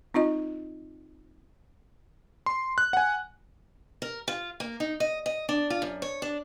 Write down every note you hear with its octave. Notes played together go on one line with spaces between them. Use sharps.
C4 D#4 F4 D#5
C6
F#6
F#5 G#5
A#4
F4
A#3
D#4
D#5
D#5
D4
F4
F#2
C#5
D4